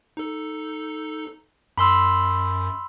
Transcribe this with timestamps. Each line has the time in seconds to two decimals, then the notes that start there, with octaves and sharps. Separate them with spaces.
0.17 D#4 A4
1.78 F#2 B5 C6 E6